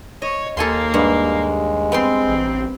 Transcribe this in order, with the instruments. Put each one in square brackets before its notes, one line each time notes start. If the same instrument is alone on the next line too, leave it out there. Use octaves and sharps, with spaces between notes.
[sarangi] C#5 [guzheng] D#5
[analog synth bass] D#2 [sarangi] A#3 [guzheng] A4 G#5 C6
[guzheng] G2 F#5 [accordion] G#3
[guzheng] B3 G5 C6 [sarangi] C4
[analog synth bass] A1